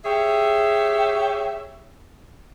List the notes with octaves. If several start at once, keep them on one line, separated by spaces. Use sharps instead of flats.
G4 G#4 C#5 E5